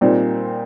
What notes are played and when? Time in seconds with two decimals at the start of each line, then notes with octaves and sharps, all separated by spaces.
0.01 A#2 G3 C4 D#4